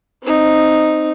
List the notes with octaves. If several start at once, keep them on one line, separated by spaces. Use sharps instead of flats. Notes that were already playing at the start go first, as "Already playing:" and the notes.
C4 D#4